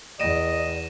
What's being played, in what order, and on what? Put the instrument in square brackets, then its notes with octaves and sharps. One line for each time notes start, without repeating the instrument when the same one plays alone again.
[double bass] E2 [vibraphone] D5 [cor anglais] D#5 [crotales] A#6 D#7 E7